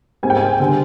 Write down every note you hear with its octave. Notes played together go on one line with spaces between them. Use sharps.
G#2 G3 C4 G#5
G5
G#5
D3 G3